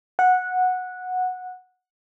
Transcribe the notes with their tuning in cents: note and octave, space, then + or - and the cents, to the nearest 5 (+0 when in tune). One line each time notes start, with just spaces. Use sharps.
F#5 -10